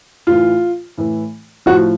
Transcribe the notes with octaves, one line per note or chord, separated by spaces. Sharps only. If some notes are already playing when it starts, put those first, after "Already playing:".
A2 E3 F4
A2 E3
A2 F3 F#4